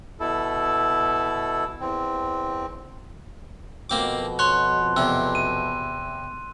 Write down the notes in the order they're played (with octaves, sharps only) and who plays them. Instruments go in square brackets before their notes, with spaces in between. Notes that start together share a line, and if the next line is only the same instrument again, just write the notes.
[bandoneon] B2 E4 A4
E2 C4
[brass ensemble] F2 B2 [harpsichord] A#3 C4 D6
[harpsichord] C#5 [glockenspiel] C6 F#6
[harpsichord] E2 C3 [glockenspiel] E6
[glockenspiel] D#7